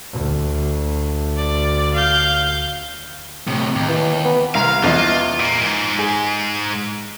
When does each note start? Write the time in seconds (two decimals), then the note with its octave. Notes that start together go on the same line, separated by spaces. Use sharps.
0.12 D2
1.37 D5
1.94 F5 G6
3.47 A2 C3
3.75 D#2
3.88 E3
4.25 B3
4.55 C2 F5 A#5
4.83 E2 F3 F4 D#5
5.40 A#2 A#3
5.61 G#2
5.99 G#4